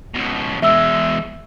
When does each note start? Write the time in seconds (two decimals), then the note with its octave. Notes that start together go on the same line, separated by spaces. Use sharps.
0.15 C#2 B2
0.62 E2 G#3 E5 E6